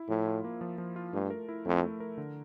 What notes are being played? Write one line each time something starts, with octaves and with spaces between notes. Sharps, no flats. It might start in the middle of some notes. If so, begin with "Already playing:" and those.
Already playing: E4
A2 F3
F4
A#3
F3
F3
F4
G2 A3
A#4
E4
F2 A3
A3
A#4
D3